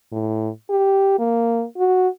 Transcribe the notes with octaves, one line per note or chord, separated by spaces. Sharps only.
A2
G4
A#3
F#4